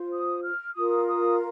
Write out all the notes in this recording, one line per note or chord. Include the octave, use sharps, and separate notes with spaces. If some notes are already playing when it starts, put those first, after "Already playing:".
Already playing: F4 C5
D#6
F6
F4 A#4 D#6
D#6